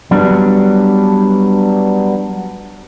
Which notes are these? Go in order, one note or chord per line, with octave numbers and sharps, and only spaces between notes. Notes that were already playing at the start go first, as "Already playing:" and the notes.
F#3 G3 B3 D4